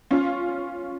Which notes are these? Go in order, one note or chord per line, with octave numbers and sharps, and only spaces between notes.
C#4 F4